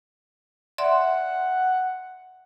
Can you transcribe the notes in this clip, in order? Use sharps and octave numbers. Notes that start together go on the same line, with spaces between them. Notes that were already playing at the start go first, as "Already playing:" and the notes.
D5 E5 F#5 C6